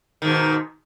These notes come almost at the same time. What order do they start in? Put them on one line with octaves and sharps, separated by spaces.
D#3 G#2 B2